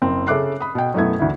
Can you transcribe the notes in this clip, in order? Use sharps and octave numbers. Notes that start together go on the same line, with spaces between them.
F#1 C4
C#3 A4 E5 D6 F#6 C7
B5 D#6
B2 G5
F#2 B2 A3 B3 E4 G#6
D2 E3 E4